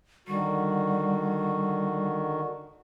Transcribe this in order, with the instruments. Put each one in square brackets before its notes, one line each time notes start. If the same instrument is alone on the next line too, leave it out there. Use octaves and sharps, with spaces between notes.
[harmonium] D3 D#3 F#4 [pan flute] G3